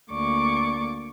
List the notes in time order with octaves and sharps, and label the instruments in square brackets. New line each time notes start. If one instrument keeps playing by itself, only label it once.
[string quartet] D2 A#3 D5 C#6 D6